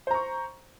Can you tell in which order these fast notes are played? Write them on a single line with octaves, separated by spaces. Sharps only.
C5 A#5 C#6